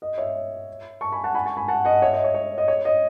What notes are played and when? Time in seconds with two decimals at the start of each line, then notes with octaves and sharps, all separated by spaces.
0.02 D#5
0.18 C#5 E5
1.01 A5 C#6
1.12 G#5 B5
1.24 F#5 A5
1.34 G#5 B5
1.46 A5 C#6
1.57 G#5 B5
1.68 F#5 A5
1.85 D#5 F#5
2.02 C#5 E5
2.13 D#5
2.24 C#5
2.34 C#5
2.58 D#5
2.68 C#5
2.85 D#5